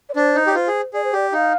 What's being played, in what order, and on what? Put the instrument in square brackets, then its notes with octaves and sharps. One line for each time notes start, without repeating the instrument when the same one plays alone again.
[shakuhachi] D5
[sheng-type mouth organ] D4 [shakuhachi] C5
[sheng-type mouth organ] D#4
G4
[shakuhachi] D5
[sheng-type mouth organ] F4 [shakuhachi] C5
[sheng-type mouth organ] G#4
[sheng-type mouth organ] G#4 [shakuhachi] D5
[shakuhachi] C5
[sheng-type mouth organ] G4 [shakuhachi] D5
[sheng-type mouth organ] D#4 [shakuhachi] F5